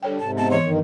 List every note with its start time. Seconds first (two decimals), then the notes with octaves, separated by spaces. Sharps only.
0.03 D3 G3 A4 C#5 G5
0.20 G#2 C3 A5
0.37 B3 A5
0.51 E3 C#5 D#5 C6
0.64 G2 D#3